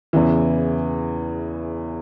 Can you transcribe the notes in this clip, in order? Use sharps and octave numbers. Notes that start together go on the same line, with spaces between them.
E2 C#3 E3